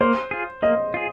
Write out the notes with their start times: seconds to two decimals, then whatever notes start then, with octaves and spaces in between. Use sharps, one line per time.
0.01 A#3 C5
0.31 F4 G#4
0.62 A#3 D#5
0.94 F4 G#4